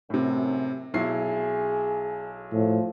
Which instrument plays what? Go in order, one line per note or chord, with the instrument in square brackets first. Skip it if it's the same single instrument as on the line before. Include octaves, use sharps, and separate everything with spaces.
[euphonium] F#2 [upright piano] A2 C3
[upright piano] B1 E4 C7 [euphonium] G#4
[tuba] A2 [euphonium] F3